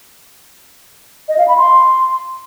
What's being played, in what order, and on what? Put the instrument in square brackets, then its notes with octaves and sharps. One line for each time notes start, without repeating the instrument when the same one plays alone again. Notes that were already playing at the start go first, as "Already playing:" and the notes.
[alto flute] D#5
F5
B5
C6